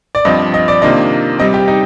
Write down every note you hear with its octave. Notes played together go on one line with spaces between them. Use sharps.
D5
G2 F3 C4 F4 D#5
D#5
D5
C3 D#3 A#3 D4 F4 D#5
C3 G3 C4 D#5
G4
D#4